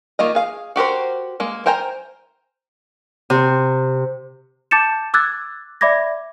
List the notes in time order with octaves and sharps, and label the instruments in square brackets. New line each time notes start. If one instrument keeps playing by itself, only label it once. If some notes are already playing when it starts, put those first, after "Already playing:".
[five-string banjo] D#3 A#3 F4 D#5
G#4 F5
F#4 G4 A#4 C5
G#3 A#3
A#4 C5 G5 G#5 A#5
[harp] C3
[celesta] A5 D6 G6 A6 C#7 E7
D6 E6 F#6 G#6 A6
D5 E5 B5 D6 G#6 A#6